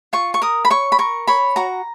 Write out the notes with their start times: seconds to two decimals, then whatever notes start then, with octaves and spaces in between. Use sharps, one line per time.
0.13 F4 C#6
0.34 C#6
0.42 A#4 D#6
0.65 B5
0.70 C#5 C#6
0.92 B5
0.98 A#4 C#6
1.27 C#5 B5
1.56 F#4 A#5